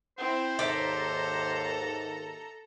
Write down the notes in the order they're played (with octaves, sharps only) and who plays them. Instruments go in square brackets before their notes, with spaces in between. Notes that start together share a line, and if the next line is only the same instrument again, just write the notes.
[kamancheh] C4 E4 [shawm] C5
[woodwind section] D#2 G#2 [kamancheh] A4 A#5 [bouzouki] D5 E5